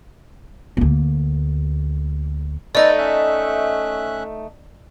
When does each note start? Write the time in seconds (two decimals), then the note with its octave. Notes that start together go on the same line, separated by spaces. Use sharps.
0.77 D2 A#3
2.75 A3 D#4 A4 B4 D5 D#5 A6
2.98 C#4 E5 F#6